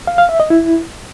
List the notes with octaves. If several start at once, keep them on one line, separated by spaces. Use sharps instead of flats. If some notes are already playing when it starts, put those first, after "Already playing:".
F5
F5
E5
D#5
E4